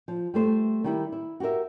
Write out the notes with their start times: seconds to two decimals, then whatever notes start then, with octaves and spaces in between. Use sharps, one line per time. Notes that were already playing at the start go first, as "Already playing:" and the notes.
0.08 F3
0.34 G3 A3 C5
0.84 D#3 G3 E4
1.12 E4
1.40 F#4 G4 A4 A#4 E5